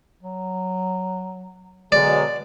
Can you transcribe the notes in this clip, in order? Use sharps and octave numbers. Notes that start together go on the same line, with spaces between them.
F#3
B2 D3 F#3 G#3 D5